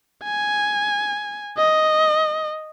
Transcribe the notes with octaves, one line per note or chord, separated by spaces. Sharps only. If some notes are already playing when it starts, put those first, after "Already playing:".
G#5
D#5